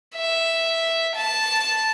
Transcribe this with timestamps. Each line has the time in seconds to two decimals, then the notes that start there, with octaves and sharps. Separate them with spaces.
0.15 E5
1.15 A5